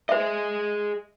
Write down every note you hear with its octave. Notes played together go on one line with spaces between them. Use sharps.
G#4 C5 D#5 E5